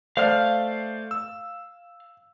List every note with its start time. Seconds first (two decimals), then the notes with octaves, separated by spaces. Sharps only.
0.17 A3 C5 D5 F5 F6
1.11 E6